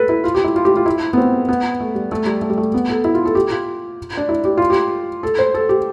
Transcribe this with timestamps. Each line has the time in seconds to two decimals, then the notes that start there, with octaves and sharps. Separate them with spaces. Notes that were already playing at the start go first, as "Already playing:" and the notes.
Already playing: A4 B4
0.09 E4
0.24 F4
0.34 G4
0.44 E4
0.56 F4
0.65 G4
0.76 F4
0.86 E4
1.13 B3
1.17 C4
1.49 B3
1.80 A3
1.95 G3
2.12 A3
2.26 G3
2.42 A3
2.50 G3
2.58 A3
2.74 B3
2.89 A4
3.04 E4
3.15 F4
3.25 A4
3.35 G4
3.51 F4
4.17 D4
4.29 E4
4.45 G4
4.57 F4
4.70 G4
5.23 A4
5.39 C5
5.54 A4
5.69 G4